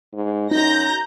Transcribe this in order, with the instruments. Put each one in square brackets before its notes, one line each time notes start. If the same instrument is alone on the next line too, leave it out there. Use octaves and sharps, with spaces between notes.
[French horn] G#2
[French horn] F#2 [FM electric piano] D#4 [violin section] A#5 G6 A#6